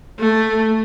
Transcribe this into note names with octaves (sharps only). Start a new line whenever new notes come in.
A3